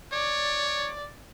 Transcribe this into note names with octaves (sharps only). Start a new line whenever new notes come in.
C#5 D5